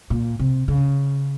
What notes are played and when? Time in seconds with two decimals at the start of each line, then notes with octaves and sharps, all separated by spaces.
0.10 A#2
0.39 C3
0.68 C#3